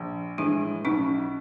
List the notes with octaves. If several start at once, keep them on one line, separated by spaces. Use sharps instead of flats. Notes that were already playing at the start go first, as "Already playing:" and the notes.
Already playing: A#1
A2 E3 G#3 D4 E4
B1 C#4 D#4